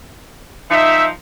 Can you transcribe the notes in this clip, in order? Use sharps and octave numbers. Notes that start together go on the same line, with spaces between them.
F3 D#4 E5